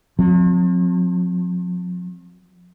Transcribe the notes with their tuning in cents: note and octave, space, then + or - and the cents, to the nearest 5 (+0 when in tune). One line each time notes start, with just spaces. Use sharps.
F3 +45 C4 +0